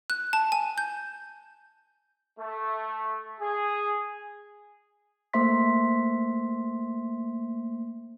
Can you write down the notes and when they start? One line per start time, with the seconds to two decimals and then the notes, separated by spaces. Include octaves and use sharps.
0.10 F#6
0.33 A5
0.52 G#5
0.78 G6
2.39 A3
3.40 G#4
5.33 A3 A#3 C5 E5 C6 B6